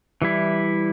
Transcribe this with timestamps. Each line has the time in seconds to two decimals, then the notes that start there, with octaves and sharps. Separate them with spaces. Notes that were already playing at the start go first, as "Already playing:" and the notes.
0.22 E3 G3 E4